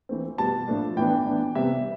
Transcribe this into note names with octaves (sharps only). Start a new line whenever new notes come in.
E3 A3 C4
B2 G3 B3 A5
A2 F3 A3 D4
A2 E3 B3 D4 G5
E3 B3 D4
C3 G3 B3 E5